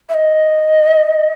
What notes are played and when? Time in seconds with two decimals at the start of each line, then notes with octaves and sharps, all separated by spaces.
0.09 E5
0.14 D#5